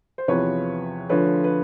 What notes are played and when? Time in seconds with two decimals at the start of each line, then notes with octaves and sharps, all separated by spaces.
0.18 C5
0.28 E2 C3 F3 B4 C#5
1.09 D2 D3 F3 B4 C#5
1.44 B4